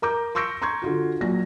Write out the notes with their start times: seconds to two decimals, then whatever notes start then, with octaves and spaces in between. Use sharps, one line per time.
0.02 A#4 A#5 D6 G6
0.35 C6 C#6 E6 G6 A#6 D7
0.62 A#5 C6 C#6 G6 G#6
0.82 D3 F4 F#4
1.21 A#1 F#3 A#6